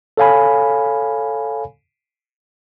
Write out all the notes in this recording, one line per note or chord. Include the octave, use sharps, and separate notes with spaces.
A4 C#5 F5 G#5 B5